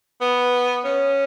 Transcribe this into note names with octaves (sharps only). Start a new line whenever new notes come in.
B3
C#4